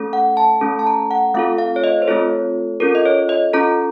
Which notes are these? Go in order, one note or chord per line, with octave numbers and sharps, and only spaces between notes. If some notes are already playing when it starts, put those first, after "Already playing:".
Already playing: A3 C#4 A4
F#5
A5
A3 C#4 A4
A5
A#5
F#5
A3 C4 F4 A4 F5
F5
C#5
D#5
C5
A3 C4 F4 A4 C#5
C#4 F4 A4 A#4
D#5
C#5
D#5
C#4 F4 A4 A#5